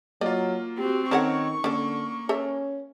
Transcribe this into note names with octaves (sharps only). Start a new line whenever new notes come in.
F#3 A#3 F4 D5 D#5
C4 F#4 G4
D#3 C4 C#4 A4 A#4 C#5 F#5 C#6
D3 A#3 C#4 A4
C#4 A4 A#4 E5